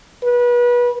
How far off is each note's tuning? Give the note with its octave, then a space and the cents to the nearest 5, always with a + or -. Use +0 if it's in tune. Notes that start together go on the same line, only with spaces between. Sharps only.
B4 -30